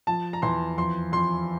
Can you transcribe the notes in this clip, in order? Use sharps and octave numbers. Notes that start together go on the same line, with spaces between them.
F3 A5
A#5
E2 C6
F2 C6
F2 C6